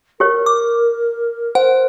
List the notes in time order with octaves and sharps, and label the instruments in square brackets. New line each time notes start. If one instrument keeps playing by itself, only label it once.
[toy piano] G4 C#5 [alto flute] A#4
[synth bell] D6
[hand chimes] C5 [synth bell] F#5